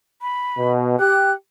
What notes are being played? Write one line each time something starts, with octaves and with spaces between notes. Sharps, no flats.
B5
B2
G4 F#6